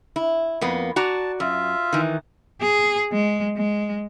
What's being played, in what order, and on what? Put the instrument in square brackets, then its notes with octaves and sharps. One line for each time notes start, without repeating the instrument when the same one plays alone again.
[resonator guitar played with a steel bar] E4
F2 A#3 B3
[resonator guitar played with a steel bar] F#4 D5 A#5 [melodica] A5
[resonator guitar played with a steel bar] F#2 [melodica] F4 E5
[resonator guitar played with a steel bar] D#3 E3
[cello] G#4
G#3
G#3